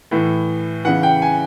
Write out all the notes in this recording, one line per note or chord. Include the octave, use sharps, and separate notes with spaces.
A2 E3
C#3 E3 F#5
G5
G#5